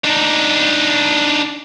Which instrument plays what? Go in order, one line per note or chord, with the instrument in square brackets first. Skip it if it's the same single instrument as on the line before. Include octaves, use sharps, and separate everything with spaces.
[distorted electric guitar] D4 D#4